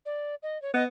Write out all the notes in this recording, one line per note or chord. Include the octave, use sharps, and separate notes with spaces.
D5
D#5
C#5
B3 D#5